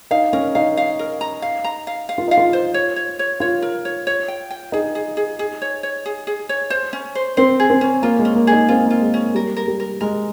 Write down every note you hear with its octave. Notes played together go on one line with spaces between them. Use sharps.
D#4 F5
C#4 A#4
D#4 F5
F5
A#4
A#5
F5
A#5
F5
F5
F4
D#4 F5
F4
C5
C#5
C#5
C#5
F4 C#5
A#4
C#5
C#5
G5
G5
D#4 G#4
G#4
G#4
G#4
C#5
C#5
G#4
G#4
C#5
C5
C#4
C5
C4 C5
G#4
C4
C#4
A#3 F4
G#3
C#4
A#3
D#4 G#4
C4 F4
A#3 F4
G#3
C#4
G3 A#4
A#4
G3
A#4
G#3 A#4